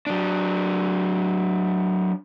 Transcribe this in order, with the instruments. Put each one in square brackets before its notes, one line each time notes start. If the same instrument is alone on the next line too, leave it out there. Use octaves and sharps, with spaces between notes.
[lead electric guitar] F#3 D4